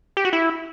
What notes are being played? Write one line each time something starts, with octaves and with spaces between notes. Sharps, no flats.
G4
F#4
E4